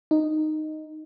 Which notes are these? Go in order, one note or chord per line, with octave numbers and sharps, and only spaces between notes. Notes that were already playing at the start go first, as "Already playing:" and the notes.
D#4